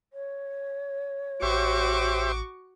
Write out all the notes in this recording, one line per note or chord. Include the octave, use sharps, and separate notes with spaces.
C#5
A1 F#4 G4 C5 E5 C#6 D6